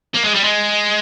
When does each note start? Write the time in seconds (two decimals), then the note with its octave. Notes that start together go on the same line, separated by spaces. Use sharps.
0.14 A#3
0.24 G#3
0.34 G3
0.44 G#3